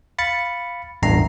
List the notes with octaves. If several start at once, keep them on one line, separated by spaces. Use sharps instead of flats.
F5 B5 A6 C#7
A1 E2 G2 A#5 C7